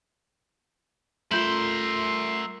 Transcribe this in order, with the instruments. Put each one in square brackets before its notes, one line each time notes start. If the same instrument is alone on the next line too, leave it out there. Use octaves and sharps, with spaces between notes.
[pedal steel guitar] A3 [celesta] F4 G6 F#7 [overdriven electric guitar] A#4 E5 [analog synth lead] C6